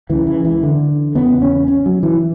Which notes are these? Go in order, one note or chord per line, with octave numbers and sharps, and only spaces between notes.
C#2 C#3 E3
E3
E3
D3
E2 C#3 B3
C#4
C#4
F#3
E3